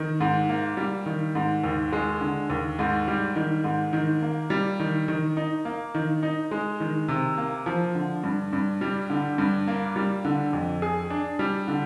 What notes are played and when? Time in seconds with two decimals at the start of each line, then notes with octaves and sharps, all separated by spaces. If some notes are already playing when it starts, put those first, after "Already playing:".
Already playing: D#3
0.20 G#2
0.49 A#3
0.77 G3
1.06 D#3
1.35 G#2
1.64 D#2
1.92 G#3
2.21 D3
2.50 D#2
2.79 G#2
3.08 G3
3.36 D#3
3.64 G#2
3.93 D#3
4.22 A#3
4.50 G3
4.79 D#3
5.08 D#3
5.37 D#4
5.65 A#3
5.95 D#3
6.23 D#4
6.51 G#3
6.80 D#3
7.08 C3
7.37 A#3
7.66 F3
7.95 D3
8.24 G2
8.53 G2
8.81 G3
9.10 D3
9.38 G2
9.68 A#3
9.96 G3
10.25 D3
10.53 F2
10.82 G#4
11.10 D4
11.39 G3
11.68 D3